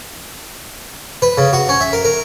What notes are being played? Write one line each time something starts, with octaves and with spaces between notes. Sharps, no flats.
B4
C#3
F#4
C#4
E5
A#4
A#4